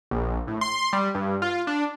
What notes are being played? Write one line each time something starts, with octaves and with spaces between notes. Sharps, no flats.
A#1
A2
C6
G3
G2
F4
D4